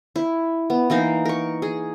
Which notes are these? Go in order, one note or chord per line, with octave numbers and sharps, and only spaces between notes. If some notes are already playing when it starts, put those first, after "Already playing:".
E4
B3
E3 A#3 D#4 F5
A#4 C#6
G#4